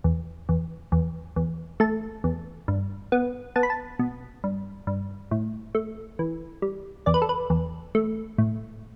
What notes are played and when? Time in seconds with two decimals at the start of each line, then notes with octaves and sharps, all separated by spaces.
0.04 E2
0.49 E2
0.92 E2
1.36 E2
1.80 A3 A5
2.24 E2
2.68 G2
3.12 B3
3.56 B3 A5
3.63 B5
3.70 A5
3.99 B2
4.44 G2
4.87 G2
5.31 A2
5.75 A3
6.19 E3
6.62 G3
7.06 E2 D5
7.14 B4
7.22 A4
7.29 B4
7.50 E2
7.95 A3
8.38 A2